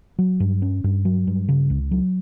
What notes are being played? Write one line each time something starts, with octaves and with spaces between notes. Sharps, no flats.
F#3
G2
C#4
G2
F#3
G2
C#3
C#2
F#3